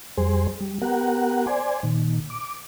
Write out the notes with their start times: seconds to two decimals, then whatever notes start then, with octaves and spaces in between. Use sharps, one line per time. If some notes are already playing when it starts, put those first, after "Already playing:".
0.18 F2 G3 G#4 C5
0.60 G3
0.82 B3 G4 A#4 F#5
1.47 C5 D5 G#5
1.83 A#2 D#3
2.30 D6